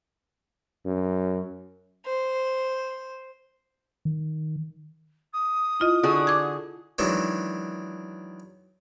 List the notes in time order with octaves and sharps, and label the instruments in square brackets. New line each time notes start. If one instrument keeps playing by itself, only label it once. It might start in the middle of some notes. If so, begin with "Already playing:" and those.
[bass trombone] F#2
[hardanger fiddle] C5
[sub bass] D#3
[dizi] D#6
[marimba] E4 F4 D#5
[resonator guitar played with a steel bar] D3 F#4 G#4
[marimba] D6 G#6
[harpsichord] D#3 E3 F#3 G#3 D4